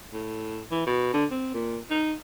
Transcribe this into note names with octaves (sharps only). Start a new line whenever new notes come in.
A2
E3
B2
D3
C4
A#2
D#4